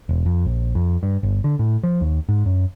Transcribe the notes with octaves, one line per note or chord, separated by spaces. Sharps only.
E1
F2
A#1
F2
G2
G1
D3
A2
F3
D#2
G#2
F#2